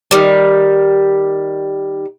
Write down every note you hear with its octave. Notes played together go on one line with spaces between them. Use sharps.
D#3 G3